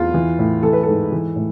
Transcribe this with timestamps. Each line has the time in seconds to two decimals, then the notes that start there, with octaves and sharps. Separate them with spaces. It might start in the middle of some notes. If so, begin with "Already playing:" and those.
Already playing: E2 F4
0.14 E3
0.39 A2
0.63 E3 A4
0.73 B4
0.83 G#2 A4
1.12 E3
1.36 A2